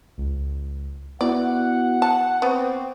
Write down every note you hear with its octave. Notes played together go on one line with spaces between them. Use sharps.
C#2
B3 E4 F#4 D5 F#5
A5
B3 C4 C#6 D6